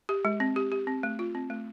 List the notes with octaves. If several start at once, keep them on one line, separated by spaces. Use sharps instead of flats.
G4
G#3
C4
G4
G4
C4
A3
F4
C4
A3